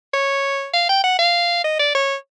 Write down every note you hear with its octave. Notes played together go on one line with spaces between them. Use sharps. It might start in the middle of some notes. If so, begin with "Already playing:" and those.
C#5
F5
G5
F#5
F5
D#5
D5
C#5